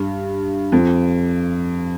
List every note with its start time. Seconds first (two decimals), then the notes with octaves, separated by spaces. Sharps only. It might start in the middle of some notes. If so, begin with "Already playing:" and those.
Already playing: G2
0.72 F2